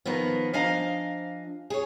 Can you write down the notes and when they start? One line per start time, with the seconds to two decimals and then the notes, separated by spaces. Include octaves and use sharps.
0.06 D#3 F3 A#3 B3
0.53 F3 D4 D#5 F5 G#5 A#5
1.70 G#4 C#5